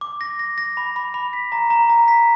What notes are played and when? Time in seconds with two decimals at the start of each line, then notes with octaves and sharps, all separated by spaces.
0.01 D6
0.21 A#6
0.39 A#6
0.58 A#6
0.77 B5
0.96 B5
1.14 B5
1.33 B6
1.52 A#5
1.70 A#5
1.89 A#5
2.08 B6